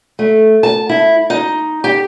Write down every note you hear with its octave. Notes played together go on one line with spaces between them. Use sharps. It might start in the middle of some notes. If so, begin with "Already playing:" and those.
A3
A5
E4
D#4
G4